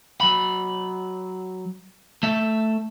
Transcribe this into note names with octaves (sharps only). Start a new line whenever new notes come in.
F#3 B5
A3 E5